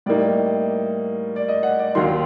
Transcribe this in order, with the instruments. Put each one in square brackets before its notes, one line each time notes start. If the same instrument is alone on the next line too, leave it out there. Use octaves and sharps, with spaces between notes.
[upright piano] A2 G3 A#3 D#4 D5
D5
D#5
F#5
D5
D#2 D#3 F#3 C6